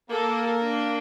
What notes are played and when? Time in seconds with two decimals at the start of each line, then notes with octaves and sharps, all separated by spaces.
0.11 A#3 A4
0.63 D4